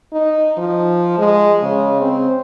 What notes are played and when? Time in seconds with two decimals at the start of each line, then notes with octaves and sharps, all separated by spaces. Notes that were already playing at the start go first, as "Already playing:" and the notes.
0.13 D#4
0.58 F3
1.18 G#3
1.63 C#3
2.01 C4